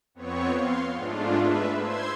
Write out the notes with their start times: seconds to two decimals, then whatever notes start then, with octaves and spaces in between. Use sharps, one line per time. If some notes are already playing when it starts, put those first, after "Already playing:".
0.14 F2 B3 C4 C#5 C#6
0.52 F5 C6
0.95 G#2 G#3 A3 D4 F4
1.37 B4 E5
1.79 C5 C6 E6 G#6